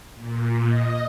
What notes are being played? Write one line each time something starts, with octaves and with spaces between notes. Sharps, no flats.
A#2
D#5